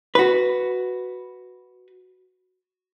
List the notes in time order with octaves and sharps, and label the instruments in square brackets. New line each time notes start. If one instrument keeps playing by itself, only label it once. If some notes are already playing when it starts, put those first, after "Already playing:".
[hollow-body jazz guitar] F#4 B4